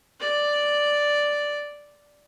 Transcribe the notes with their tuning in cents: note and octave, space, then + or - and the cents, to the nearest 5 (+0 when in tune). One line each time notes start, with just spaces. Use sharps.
D5 +0